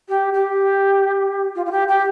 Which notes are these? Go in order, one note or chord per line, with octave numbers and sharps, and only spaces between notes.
G4
G4
F4
F4
G4
G4